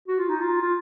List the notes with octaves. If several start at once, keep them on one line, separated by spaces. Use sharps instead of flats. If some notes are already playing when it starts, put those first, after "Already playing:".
F#4
F4
D#4
F4
F4